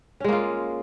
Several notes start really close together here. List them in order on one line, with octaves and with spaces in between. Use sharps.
C#4 G#3 A#3 F4